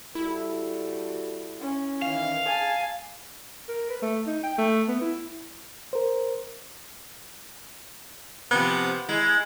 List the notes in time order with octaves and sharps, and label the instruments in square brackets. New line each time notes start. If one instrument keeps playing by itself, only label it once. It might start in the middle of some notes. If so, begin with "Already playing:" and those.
[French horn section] G3 F#4 A4 [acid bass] E4
[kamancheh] C#4
[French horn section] D#3 E3 [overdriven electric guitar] F5
[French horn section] G#4 [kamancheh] G#5 A5
[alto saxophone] A#4
B4
A3
D#4
G5
A3
B3
E4
[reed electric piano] A#4 C5
[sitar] C3 F3 [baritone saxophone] B3
[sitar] G#3 [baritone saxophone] E4